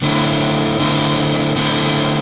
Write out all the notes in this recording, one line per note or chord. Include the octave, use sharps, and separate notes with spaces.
D3 A3 C4 E4
D3 A3 C4 E4
D3 A3 C4 E4